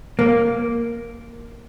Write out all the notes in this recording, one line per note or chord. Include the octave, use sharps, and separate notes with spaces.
A#3